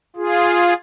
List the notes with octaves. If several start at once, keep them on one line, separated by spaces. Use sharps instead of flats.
F4 G#4